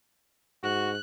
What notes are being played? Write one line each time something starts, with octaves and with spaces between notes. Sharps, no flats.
G#2 F#4 F#6